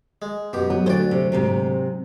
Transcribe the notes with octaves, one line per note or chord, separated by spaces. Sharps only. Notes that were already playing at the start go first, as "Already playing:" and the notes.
G#3
F#2 B2 G4
F#3 B3
D2 F#4 C5 D5
C3
G#2 C3 C4